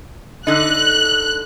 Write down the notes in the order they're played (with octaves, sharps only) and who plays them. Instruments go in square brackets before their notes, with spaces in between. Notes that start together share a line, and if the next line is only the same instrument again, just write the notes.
[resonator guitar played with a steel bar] D3 D#4 [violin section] F#6